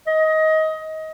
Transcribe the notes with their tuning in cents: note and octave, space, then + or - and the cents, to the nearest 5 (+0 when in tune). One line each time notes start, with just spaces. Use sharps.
D#5 +20